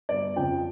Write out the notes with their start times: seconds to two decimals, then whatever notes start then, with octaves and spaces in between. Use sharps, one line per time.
0.09 G1 D5
0.36 F2 C#3 F3 G5